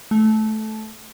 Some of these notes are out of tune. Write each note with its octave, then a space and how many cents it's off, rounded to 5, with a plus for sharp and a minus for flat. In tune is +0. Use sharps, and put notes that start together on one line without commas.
A3 -15